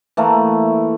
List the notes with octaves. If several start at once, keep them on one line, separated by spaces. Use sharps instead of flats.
E3 A3 A#3